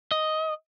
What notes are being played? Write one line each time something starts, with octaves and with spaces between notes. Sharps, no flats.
D#5